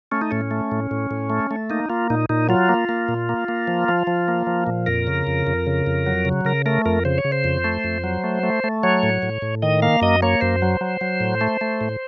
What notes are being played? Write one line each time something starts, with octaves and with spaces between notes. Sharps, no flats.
A3 C#4
D#4
A2 C#4
A3
A2
A2
A2
A3
A3
A#3 D#4
A#3 F4
A#2 D#4
A#2 D#4
F#3 F4
A#3
A#3
A#2
A#3
A#3
F3
F3
F3
A#3
F3
A#2
F2 A#4
C#3
F2
F2
C#3
F2
F#3
C#3
C#3 A#4
A3 A#4
F2 A#4
C#3 C5
C#5
C#3
C5
F2
A3
F2
F#3
A3
A3
A3
F#3 C#5
A2
A2
A2
D#3 D#5
A#3 F5
F#2 D#5
A#3 C#5
F#2 C5
F#3
F#3
F#3
A2
A3
A3
A2